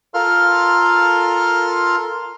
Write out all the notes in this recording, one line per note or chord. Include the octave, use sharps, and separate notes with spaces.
F4 A4 A#4 F5 C6 F6